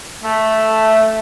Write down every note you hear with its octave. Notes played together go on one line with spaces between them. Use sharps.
A3